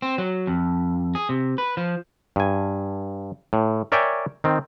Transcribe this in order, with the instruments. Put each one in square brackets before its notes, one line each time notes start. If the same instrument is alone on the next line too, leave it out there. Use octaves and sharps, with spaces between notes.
[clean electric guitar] C4
F#3
F2
G#4
C3
B4
F3
[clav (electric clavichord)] G2 G#5
A2
A#4 C#5 D5 E5 G5 G#5
D#3 C4